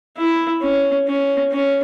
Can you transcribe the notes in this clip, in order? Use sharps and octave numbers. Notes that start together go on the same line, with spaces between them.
E4
C#4
C#4
C#4